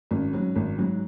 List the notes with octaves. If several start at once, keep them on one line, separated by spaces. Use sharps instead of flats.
G#1 C#4
G#2 F#3
G#1
G#2 F#3